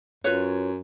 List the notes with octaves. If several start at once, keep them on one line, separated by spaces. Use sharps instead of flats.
F#2 F4 B4 C#5